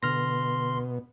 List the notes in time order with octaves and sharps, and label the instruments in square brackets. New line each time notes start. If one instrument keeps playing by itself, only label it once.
[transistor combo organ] B2 [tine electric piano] D3 F6 A#6 [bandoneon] C6